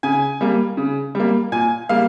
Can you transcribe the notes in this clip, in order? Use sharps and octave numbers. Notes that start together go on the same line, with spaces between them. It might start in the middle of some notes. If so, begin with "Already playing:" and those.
C#3 G#5
G3 A#3
C#3
G3 A#3
A#2 G#5
G3 A#3 F5